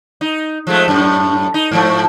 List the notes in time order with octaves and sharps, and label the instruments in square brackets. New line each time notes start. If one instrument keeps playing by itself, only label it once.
[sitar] D#4
F3 G#3 A3
F#2 A2
D#4
G#2 F3 A3